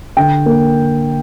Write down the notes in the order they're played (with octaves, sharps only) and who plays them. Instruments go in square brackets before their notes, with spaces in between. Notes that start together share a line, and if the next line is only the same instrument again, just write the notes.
[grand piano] D3 G5
A#3